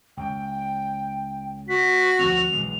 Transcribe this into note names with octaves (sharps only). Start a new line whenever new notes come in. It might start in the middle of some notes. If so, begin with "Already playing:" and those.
C#2 G5
F#4 B6
D2 F3 C4 F7
B1 E3 G#3